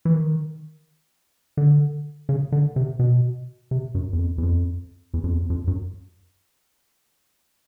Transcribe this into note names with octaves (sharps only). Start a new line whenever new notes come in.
E3
D#3
D3
C#3
D3
C3
B2
C3
F#2
E2
F2
E2
F2
E2
F2
E2
F2
F#2